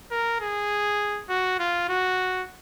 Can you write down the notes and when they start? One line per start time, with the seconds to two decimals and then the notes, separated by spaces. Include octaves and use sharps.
0.11 A#4
0.41 G#4
1.29 F#4
1.59 F4
1.89 F#4